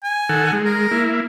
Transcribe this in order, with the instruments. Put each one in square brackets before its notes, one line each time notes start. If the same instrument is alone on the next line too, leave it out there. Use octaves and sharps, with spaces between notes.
[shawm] G#5
[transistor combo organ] D#3 A4 F#5
G#3
[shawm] A#4
[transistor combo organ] A#3 E4